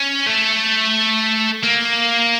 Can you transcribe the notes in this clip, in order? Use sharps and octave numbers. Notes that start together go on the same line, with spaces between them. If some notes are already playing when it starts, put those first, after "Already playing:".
Already playing: C#4
A3
A#3